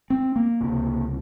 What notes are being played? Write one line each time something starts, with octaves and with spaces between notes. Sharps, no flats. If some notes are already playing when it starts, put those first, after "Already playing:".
C4
A#3
C#2 C3